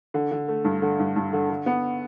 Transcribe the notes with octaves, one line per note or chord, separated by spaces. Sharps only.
D3
D3
A3
G2
D3
G2
G2
D3
D3
B3